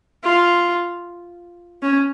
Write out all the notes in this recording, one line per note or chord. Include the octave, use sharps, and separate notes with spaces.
F4
C#4